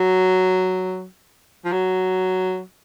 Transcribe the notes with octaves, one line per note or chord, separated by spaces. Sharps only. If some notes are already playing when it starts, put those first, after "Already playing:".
Already playing: F#3
F3
F#3